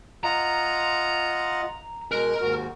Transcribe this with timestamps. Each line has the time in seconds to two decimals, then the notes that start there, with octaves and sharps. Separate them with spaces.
0.24 F4 D#5 F#5 A#5
2.11 B2 G#3 A#4 F#6
2.41 D#2 G#2 F#4